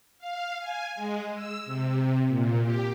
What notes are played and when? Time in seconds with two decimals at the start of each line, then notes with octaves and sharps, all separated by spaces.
0.19 F5
0.59 G#5
0.96 G#3
1.34 E6
1.65 C3
2.28 A#2
2.63 G4